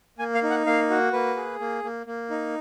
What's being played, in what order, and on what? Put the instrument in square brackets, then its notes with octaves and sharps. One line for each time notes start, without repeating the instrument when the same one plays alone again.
[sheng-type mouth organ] A#3 G#5
F5
D#4
F#5
A#3 F5
F#4
A#3 B4
G#4
A#3
A#3
A#3
D#4